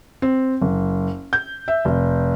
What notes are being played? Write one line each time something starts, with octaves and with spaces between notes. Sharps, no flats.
C4
F#1
G6
E5
F1